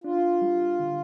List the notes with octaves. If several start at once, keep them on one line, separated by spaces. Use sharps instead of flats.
D4 F4
G3
D3